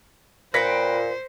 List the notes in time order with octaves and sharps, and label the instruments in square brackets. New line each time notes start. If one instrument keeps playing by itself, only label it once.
[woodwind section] A#2 [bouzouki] B4 G5 [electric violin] C5 [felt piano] A#6 B6 C#7